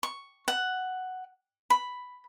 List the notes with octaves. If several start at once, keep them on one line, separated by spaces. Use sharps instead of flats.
C#6
F#5
B5